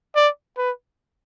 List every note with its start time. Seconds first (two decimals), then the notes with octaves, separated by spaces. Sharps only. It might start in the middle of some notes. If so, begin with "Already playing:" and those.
0.16 D5
0.58 B4